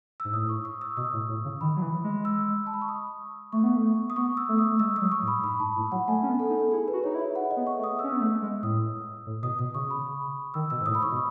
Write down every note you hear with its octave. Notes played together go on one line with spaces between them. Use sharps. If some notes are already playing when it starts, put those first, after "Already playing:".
G#2 E6
A2 D#6
C#6
D#6
E6
B2 D#6
A2
A2
C#3
D#3 B5
F#3
E3
G#3
E6
A5
B5
C#6
D#6
A3 C#6
B3
A3
D#6
B3 C#6
E6
A3
D#6
A3
G#3 E6
G#3 D#6
F#3
C#6
A2
B5
G#2 B5
G#2 A5
A2
F#3 F#5
A3 G#5
C#4
B3
A4
D#4
A4
E4 G#4
B4
F#4
D#4 C#5
E4
E5
F#5
D#5
B3
C#6
A3
D#6
C#4 E6
B3
A3
G#3
A2 D#6
A2
B2 D#6
B2 D#6
C#3 C#6
B5
D#3 E6
B2 E6
G#2
A2 D#6
B5
G#2 C#6
B2